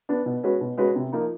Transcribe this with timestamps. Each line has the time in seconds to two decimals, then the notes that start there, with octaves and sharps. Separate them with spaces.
0.09 B3 D4
0.26 B2
0.43 G#3 C#4 F#4 B4
0.61 B2
0.77 G#3 C#4 F#4 B4
0.96 C3
1.12 F3 A#3 D#4